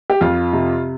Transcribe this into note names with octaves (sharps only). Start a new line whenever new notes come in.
G4
F2 F4
C3